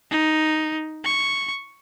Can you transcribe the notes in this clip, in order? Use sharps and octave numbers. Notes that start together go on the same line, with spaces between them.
D#4
C#6